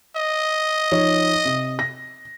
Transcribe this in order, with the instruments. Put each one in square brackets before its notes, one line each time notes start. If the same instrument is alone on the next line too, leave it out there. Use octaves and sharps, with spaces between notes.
[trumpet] D#5
[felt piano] F3 D#4 C#5
C3
A#6